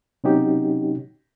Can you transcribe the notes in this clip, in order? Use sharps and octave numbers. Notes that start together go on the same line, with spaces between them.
C3 F#3 C#4 D#4 F#4 G4